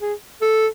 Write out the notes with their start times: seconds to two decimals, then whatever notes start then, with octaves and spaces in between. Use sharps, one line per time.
0.01 G#4
0.42 A4